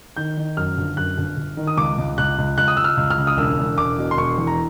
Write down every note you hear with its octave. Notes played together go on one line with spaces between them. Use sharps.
D#3 G6
D#3
F#2 F6
G1
F#2 F#6
G1
G1
D#3
D#6
C#2 D6
C#2
C#2 F#6
C#2
C#2 F#6
D#6
C#2 E6
F6
C#2
F6
C#3
D#6
E1 E6
E1
E1 D6
B2
C6
E1 C#6
E2
A#5